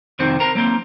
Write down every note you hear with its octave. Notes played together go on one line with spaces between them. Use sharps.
C2 F2 C3 D#3 C4 C5
A#4 C5 A#5
F#3 A#3 C4